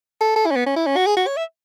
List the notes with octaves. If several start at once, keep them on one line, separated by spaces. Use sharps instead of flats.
A4
A4
E4
C#4
B3
C#4
E4
C#4
F#4
G#4
F#4
C#5
E5